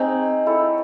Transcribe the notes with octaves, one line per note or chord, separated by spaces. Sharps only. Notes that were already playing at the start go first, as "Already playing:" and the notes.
Already playing: C4 D#4 G#4 C#5
E4 A4 C#5